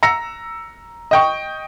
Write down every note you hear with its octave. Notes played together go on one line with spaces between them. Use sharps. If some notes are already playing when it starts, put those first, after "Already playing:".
A#5 E6 A#6 C#7
D#5 G5 C#6